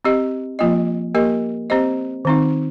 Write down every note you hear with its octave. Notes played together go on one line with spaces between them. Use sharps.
C4 G4 D#5
F3 A#3 F4 D#5
A#3 G4 A#4 D#5
C4 G4 C5 D#5
D#3 C4 D#4